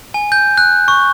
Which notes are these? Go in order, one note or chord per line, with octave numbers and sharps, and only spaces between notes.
G#5
G6
F#6
C#6